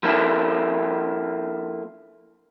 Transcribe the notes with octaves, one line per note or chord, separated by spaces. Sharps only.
F3 A#3 E4 F4 A4